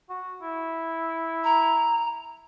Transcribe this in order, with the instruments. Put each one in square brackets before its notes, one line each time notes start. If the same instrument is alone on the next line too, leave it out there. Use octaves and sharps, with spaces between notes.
[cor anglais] F#4
E4
[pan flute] A#5